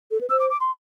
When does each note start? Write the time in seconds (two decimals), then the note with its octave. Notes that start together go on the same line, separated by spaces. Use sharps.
0.11 A4
0.21 B4
0.30 C5 E6
0.40 D6
0.50 D6
0.60 C6